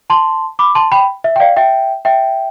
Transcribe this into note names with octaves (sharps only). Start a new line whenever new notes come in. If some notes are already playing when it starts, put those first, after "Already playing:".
A5 C6
B5 D6
A5 C6
G5 B5
E5
G5
D5 F5
E5 G5
E5 G5